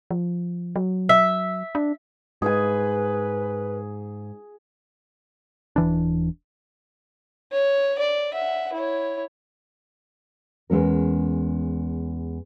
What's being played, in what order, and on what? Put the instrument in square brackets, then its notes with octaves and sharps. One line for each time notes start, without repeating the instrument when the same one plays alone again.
[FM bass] F3
F#3
[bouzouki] E5
[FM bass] D4
[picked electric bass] G#2 [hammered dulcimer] G#4 G#5 [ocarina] B4
[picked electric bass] D#1 E3 D4
[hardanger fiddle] C#5
D5
E5 F#5
E4 C#5
[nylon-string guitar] E2 G#3 C#4 A#4